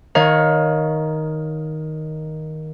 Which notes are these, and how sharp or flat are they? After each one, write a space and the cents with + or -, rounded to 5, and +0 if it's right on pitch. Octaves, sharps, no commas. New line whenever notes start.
D#3 +5 C#5 +0 F5 +25